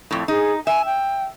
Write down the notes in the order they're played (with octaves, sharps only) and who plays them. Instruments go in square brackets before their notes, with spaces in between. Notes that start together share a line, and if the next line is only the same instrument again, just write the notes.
[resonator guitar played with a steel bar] F2 A2
[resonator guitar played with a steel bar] D#4 [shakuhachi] G#4
[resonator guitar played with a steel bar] E5 [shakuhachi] G#5
[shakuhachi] G5